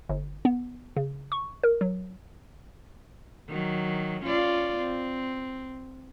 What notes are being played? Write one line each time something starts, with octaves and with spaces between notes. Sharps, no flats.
G1
B3
C#3
C#6
A#4
F#3
D#3 F#3
C#4 F4 D5
C4